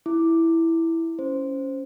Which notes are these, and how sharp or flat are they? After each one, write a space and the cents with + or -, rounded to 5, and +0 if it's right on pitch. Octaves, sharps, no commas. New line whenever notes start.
E4 +0 D6 +0
C#4 +0 C5 +0